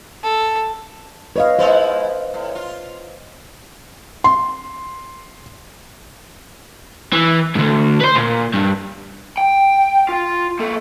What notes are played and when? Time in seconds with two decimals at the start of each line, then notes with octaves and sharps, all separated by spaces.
0.23 A4
1.36 B4 C#5 D#5 F5
1.59 G#3 B3 E4 C5
2.34 A2
2.55 F4
4.24 C6
7.13 E3
7.55 D2 G#2
8.00 B4 C5
8.15 A#2
8.53 G2
9.38 G5
10.09 F4
10.59 A#3 A4